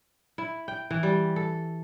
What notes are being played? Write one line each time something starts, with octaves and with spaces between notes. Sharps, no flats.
E4
G5
E3
G3
A4